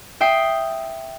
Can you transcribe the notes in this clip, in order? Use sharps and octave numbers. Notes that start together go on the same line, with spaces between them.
E5 G5 D#6 C7